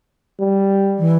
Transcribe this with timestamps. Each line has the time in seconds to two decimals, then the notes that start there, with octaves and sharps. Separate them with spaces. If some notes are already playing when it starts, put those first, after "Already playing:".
0.40 G3
0.98 E3